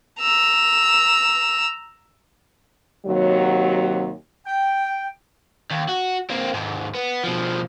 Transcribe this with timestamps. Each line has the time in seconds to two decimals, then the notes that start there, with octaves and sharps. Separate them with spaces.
0.20 A#5 E6
3.05 D#2 C3 F#3
4.47 G5
5.71 D#2
5.89 F#4
6.30 A#3 C4
6.54 D#2 G#2
6.95 B3
7.24 B2 F3